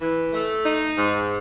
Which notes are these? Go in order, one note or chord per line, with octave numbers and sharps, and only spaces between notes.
E3
A3
D#4
G#2